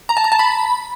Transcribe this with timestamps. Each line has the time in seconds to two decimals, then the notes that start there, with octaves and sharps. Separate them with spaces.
0.09 A#5
0.17 A5
0.24 A#5
0.32 A5
0.39 B5